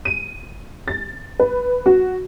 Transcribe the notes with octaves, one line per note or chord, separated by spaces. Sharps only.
D#7
A6
B4
F#4